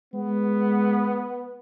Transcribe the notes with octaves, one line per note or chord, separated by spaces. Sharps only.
G#3 B3